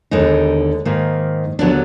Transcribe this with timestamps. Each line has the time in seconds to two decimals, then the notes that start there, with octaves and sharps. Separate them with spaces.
0.11 D#2 D3 G#3 B3 D#4
0.85 G#2 D#3 A#3
1.59 D#2 D3 F#3 B3 D4